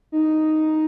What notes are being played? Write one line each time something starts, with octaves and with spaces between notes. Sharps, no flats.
D#4